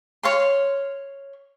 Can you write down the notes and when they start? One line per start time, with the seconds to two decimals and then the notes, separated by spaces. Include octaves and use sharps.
0.23 C#5 F5 C6